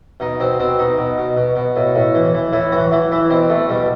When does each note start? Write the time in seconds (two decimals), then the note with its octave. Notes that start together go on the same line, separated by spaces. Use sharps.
0.20 B2 D#4
0.40 B2 C4
0.59 B2 C4
0.79 B2 D#4
0.98 B2
1.18 B2
1.37 B2
1.56 B2
1.76 A2
1.95 A2
2.15 E3
2.34 E3
2.53 A2 E4
2.72 E3 F#4
2.92 E3 E4
3.11 E3 E4
3.30 B2 C4
3.49 B2 A3
3.69 B2 G3